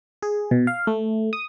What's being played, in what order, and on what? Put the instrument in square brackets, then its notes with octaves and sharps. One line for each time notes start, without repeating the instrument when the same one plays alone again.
[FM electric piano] G#4
B2
F5
A3
D#6